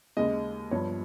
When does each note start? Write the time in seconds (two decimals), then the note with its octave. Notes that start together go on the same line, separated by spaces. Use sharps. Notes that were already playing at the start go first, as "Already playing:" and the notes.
0.17 D#2 C#3 G#3 D#5
0.71 G1 G2 F3 C#5